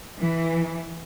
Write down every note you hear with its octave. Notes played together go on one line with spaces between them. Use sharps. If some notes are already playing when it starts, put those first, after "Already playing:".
E3